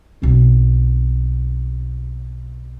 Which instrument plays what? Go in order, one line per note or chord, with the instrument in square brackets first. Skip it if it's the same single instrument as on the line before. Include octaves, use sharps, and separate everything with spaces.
[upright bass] B1 C4